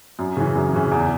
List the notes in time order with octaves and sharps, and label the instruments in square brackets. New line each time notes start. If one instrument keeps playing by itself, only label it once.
[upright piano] F#2
C#3 E3
F#2
C#3 E3
E2